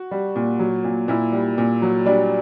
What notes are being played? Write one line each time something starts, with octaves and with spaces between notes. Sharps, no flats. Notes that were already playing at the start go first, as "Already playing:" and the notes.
Already playing: F#4
G3
A#2
F#3
A#2
A#2 E4
G3
A#2
F#3
G3 D4